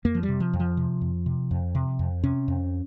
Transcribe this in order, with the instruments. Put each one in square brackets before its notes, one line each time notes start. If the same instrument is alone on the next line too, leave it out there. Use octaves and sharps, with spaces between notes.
[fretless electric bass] F2 A#3
F3
G3
C3
F3
F2
F3
C3
F2
C3
F2
C3
F2
C3 C#4
F2